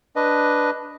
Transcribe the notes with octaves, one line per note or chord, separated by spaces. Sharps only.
D4 B4 D#5